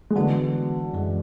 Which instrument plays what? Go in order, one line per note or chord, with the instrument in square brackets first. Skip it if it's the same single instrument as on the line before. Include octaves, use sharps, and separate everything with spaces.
[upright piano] G#3
[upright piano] D3 F#3 [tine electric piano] E3 B3 F#4
[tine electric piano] F#2 E3 G#3